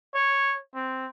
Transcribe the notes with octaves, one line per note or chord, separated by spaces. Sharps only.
C#5
C4